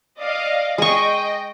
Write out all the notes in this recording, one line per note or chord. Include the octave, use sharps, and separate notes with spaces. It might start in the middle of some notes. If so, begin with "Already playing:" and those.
D5 D#5 F5
G#3 D#5 G5 C#6